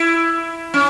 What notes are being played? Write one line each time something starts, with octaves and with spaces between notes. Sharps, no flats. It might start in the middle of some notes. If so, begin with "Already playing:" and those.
Already playing: E4
C#4